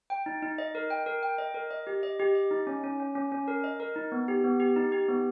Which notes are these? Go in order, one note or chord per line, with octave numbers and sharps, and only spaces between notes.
G5
D#4
D#4
D#5
A#4
G5
A#4
G5
D#5
A#4
D#5
G4
D#5
G4
D#5
D#4
C#4
C#4
C#4
C#4
C#4
A#4
D#5
A#4
D#4
B3
G4
B3
G4
D#4
G4
B3